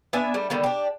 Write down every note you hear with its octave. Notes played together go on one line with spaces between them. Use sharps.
B3 D4 E5 G#5
G3 A3
D3 D#3 G3 B3
D4 G4